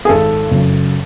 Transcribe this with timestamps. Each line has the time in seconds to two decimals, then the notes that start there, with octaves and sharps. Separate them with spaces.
0.05 G#4
0.09 G#1 A4
0.51 F#2 C#3